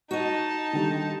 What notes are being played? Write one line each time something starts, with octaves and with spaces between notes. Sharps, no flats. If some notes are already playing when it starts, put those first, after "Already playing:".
D#4 F#4 D#5 A5
D3 D#3 G3